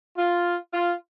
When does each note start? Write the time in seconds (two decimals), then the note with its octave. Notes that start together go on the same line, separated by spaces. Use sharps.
0.16 F4
0.73 F4